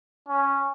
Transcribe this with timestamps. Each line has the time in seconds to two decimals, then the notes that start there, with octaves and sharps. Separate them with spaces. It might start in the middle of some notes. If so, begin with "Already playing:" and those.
0.28 C#4